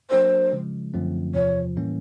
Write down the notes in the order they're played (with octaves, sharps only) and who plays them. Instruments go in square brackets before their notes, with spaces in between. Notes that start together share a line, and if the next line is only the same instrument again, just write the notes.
[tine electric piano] F#3 A#3 D4 F#4 A#4 [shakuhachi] C5
[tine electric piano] C#3 F3 G#3
F#2 D3 F3 A3 C4
[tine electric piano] E2 C3 F3 [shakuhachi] C#5
[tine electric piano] A2 E3 G3 A#3 C#4